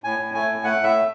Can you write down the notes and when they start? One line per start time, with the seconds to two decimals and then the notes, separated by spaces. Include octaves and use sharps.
0.04 A2 G#5
0.19 A2
0.34 A3 G#5
0.49 A2
0.64 A3 F#5
0.78 A2
0.84 E5
0.93 A3